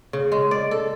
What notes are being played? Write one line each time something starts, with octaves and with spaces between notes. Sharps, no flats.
C#3
G#3
D5
A4